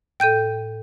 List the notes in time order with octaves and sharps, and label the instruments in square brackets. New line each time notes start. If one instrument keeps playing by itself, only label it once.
[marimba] A2 A4 [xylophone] G5 G6 D#7